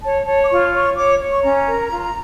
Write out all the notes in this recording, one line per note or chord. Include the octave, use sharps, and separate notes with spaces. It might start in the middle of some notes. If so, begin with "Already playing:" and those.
C#5 A5
C#5 A5
D6
F4 C#6
C#5 C#6
C#5 D6
C#5
C#6
C#4 A#5
A#4
F4